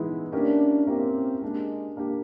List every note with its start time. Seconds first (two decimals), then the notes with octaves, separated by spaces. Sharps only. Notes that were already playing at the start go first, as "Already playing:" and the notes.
Already playing: E3 G#3 B3 D#4 E4
0.32 A#3 C#4 D4 E4 G4 A#4
0.87 A#3 C4 C#4 E4 G4 A#4
1.42 G#3 A#3 D4 G4
1.97 A#3 D4 G4